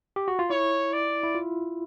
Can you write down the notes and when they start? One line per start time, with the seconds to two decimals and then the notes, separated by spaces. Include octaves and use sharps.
0.16 G4
0.28 F#4
0.39 F4
0.50 E4 C#5
0.93 D5
1.23 E4
1.35 F4